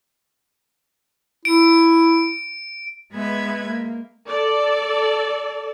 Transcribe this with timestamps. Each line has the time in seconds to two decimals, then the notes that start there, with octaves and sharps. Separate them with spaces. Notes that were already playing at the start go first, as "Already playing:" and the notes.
1.45 E4 D7
3.12 G#3 B3 B4 E5 G#6
3.68 A#3
4.27 A4 D5